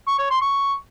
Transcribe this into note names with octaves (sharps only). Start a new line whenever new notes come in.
C#6
C#5
C6
C#6